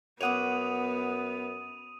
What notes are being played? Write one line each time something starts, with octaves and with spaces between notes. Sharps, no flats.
F#2 B3 C#5 F#5 D6 D#6 D#7 F7